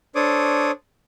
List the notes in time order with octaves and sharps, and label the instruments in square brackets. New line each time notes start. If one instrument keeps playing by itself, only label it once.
[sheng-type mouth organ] D4 A4 C5 C#5 D6 D#6